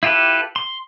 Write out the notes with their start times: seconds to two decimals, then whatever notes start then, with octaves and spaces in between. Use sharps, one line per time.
0.03 E4 F4 G4 A4 B4
0.56 C6